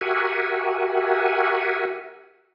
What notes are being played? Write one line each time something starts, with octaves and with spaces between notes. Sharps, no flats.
F#4 G4 A#4 E5 F#5 G#5